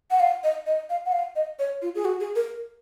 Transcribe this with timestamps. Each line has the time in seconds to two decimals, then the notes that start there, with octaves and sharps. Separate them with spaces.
0.11 F#5
0.20 F5
0.43 D#5
0.66 D#5
0.90 F5
1.05 F#5
1.12 F5
1.36 D#5
1.59 C#5
1.82 F4
1.95 G#4
2.05 F#4
2.20 G#4
2.36 A#4